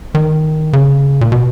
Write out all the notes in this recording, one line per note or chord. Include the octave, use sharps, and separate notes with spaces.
D#3
C#3
A#2
B2